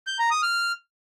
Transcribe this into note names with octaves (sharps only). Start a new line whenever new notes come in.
G6
A#5
D#6
F6